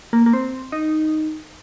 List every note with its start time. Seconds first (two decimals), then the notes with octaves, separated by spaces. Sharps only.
0.13 A#3
0.26 A#3
0.33 C4
0.72 D#4